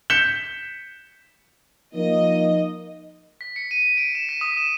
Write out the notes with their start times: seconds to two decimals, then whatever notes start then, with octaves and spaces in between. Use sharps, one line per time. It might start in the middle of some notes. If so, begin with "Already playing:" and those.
0.10 G6 B6 C#7 E7 G7
1.94 F3 A#3 D#4 D#5
3.41 B6
3.56 C#7
3.71 D#7
3.97 D7
4.15 E7
4.29 B6
4.41 D#6
4.57 E7